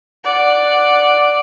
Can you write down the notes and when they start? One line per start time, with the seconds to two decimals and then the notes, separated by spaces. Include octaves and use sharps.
0.24 D5 F#5